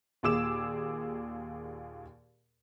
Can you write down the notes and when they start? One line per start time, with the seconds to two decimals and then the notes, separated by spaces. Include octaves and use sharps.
0.23 D#2 A#2 G#4 D6 E6 E7